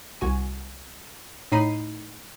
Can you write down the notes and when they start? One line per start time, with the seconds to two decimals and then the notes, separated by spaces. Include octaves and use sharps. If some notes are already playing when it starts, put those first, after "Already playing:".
0.21 C2 F#4 G#5
1.52 A2 D#4 B5 C7 D#7